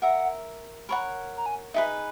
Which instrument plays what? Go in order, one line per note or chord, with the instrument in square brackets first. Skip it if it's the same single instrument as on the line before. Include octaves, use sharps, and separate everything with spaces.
[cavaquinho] A#4 E5 A#5 [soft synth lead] F#5
[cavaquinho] A#4 C#5 F#5 [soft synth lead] B5
[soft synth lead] A#5
G#5
[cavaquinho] D#4 G#4 B4 [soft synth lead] E5